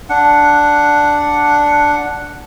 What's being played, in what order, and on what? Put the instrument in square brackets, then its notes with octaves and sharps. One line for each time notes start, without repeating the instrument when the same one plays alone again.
[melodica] D4 F#5